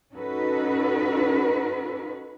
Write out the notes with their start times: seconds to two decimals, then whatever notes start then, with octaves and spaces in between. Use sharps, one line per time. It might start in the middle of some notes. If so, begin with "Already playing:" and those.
0.13 C#4 D#4 F#4 A4 B4